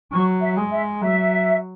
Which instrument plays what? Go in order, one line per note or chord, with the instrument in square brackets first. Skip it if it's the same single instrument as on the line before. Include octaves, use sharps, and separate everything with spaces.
[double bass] F#3 [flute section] C#6
[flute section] E5
[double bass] G#3
[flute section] E5
[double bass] F#3 [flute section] E5